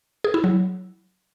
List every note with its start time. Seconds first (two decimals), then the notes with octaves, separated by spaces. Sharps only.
0.24 G#4
0.34 E4
0.44 F#3